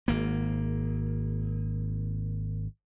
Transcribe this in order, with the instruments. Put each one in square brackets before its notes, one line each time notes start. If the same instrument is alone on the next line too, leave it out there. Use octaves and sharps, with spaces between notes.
[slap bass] G#1 A#3